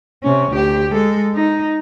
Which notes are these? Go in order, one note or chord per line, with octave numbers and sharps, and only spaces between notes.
C3 C#4
D2 G4
G#3 A4
D#4